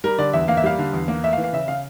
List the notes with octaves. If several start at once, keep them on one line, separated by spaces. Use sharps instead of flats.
G3 A#4
D3 D5
E2 E5
A#3 F5
E5
G3 F5
D3
E2
A#3
A3 E5
F5
E3
F5
C#3 E5
C#3 F5